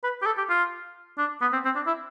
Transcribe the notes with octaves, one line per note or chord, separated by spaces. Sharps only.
B4
G4
A4
G4
F4
D4
B3
C4
C4
D4
E4